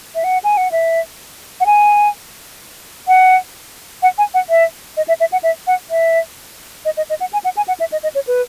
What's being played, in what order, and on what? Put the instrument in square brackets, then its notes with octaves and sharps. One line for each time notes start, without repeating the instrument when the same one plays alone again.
[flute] E5
F#5
G#5
F#5
E5
F#5
G#5
F#5
F#5
G#5
F#5
E5
D#5
E5
E5
F#5
E5
F#5
E5
D#5
D#5
D#5
F#5
G#5
F#5
G#5
F#5
E5
D#5
D#5
C#5
B4